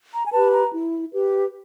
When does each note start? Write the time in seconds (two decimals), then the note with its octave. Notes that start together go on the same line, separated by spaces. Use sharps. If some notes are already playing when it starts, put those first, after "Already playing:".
0.12 A#5
0.26 G#5
0.32 G4 B4 A5
0.52 A#5
0.73 E4
1.13 G4 B4